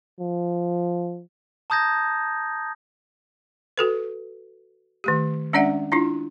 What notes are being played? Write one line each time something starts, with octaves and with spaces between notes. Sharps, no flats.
F3
A5 A#5 D#6 G6 G#6 A#6
F#4 A4 B4
D#3 A3 G4
G#3 C#4 D4 D5 E5 F#5
D4 E4 F4